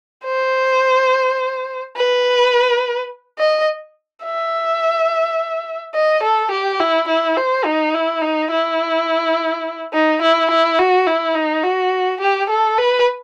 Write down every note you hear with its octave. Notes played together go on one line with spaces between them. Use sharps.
C5
B4
D#5
E5
D#5
A4
G4
E4
E4
C5
D#4
E4
D#4
E4
D#4
E4
E4
F#4
E4
D#4
F#4
G4
A4
B4